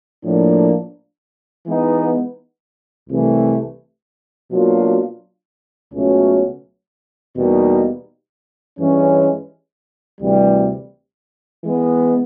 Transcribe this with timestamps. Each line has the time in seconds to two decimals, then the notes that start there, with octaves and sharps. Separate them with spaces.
0.25 A2 F3 A#3 D4
1.67 E3 G#3 B3 D#4
3.09 C2 C3 E3 A3
4.52 B2 F#3 A#3 D4 F4
5.94 C#2 B2 F#3 A3 C#4
7.36 E2 B2 G3 A#3 D#4
8.79 G2 E3 G#3 C#4
10.21 D2 C3 E3 G3
11.64 E3 G#3 B3